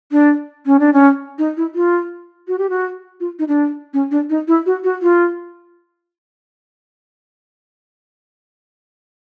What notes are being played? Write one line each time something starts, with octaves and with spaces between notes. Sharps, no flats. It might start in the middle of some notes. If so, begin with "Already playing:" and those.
D4
C#4
D4
C#4
D#4
E4
F4
F#4
G4
F#4
F4
D#4
D4
C#4
D4
D#4
E4
F#4
F#4
F4